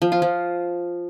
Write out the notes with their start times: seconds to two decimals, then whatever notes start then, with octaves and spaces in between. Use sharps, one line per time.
0.02 F3
0.12 F4
0.22 F3